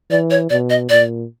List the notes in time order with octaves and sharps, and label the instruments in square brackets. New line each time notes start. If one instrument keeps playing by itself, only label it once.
[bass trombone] E3 [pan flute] D5
[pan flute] C#5
[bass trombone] B2 [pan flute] D5
[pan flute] D#5
[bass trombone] A#2 [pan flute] D5